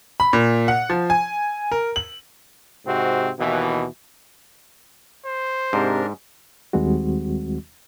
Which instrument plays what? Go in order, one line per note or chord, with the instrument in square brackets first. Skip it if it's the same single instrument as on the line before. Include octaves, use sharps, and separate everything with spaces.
[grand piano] B5
A#2
F#5
F3
G#5
A#4
F#7
[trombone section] G#2 C3 C4 F#4
D#2 B2 E3
[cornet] C5
[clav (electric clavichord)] G#2 [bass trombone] C3 [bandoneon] D4 A#4
[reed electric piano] D#2 D#3 G3 G#3 C4 F#4